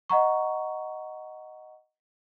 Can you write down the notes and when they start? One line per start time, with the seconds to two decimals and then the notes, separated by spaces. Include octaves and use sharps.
0.10 D#5 F#5 A#5 C#6